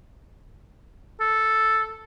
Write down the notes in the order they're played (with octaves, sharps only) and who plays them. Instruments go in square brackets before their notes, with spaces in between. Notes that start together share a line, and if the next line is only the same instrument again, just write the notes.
[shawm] A4